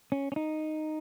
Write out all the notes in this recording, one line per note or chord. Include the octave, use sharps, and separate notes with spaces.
C#4
C#4
D#4